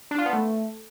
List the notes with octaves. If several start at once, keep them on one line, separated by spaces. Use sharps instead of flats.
D4
F4
B3
A3